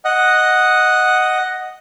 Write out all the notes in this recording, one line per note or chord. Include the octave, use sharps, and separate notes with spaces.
D#5 F#5